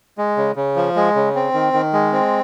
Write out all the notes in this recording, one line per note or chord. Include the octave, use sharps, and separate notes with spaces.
G#3
C#3
C#3
F3
G#3
C#3
C4
D#3
D#3
G#3
C4